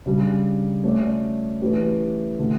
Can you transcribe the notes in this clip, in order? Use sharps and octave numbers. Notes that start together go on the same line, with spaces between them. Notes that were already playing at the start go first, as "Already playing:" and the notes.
C#3 G3 D4
A3 C#4 F#4 A4 D5
E3 A3 C#4 G4 B4
D3 A3